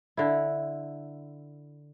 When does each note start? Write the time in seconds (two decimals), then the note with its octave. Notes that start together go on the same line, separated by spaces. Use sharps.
0.17 D3 E4